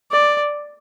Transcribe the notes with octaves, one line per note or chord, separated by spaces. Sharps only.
D5